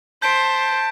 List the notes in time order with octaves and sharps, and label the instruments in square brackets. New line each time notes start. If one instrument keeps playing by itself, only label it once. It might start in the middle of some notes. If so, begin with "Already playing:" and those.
[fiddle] C5 [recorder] A5 [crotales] G6 B6 D7